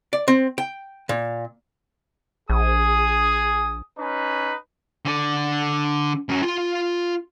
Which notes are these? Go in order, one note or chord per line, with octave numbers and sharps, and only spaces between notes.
D5
C4
G5
A#2
A#1 G#4 G#5 D#6
C#4 D#4 B4
D3 D5
F#2 F#3
F4 C6